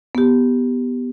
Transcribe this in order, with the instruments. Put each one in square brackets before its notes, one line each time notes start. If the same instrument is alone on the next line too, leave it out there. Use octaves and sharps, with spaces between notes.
[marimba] B3 G4